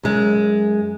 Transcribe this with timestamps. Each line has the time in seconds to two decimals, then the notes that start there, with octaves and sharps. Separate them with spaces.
0.03 F#2 G#3